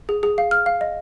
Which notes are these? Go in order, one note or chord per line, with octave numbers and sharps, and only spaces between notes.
G#4
G#4
F5
F6
F5
D#5